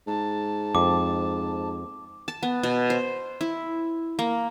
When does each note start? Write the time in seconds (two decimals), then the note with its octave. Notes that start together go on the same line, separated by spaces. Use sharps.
0.07 G#2 A5
0.75 F2 D6
2.28 A5
2.43 B3
2.63 B2
2.90 C5
3.41 E4
4.19 A#3